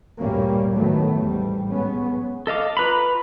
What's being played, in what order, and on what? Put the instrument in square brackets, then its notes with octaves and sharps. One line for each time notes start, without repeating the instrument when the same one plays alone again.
[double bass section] D2 G2 A#2 G3 A#3 C#4
A2 D#3 F#3 A3 B3
A1 E2 G#2 G3
B1 G#3 B3 C#4
[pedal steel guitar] A4 D#5 F5 D6
F4 B4 A#5 B5